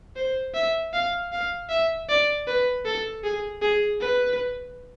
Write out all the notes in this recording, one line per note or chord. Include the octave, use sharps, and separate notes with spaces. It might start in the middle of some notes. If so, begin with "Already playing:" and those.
C5
E5
F5
F5
E5
D5
B4
A4
G#4
G#4
B4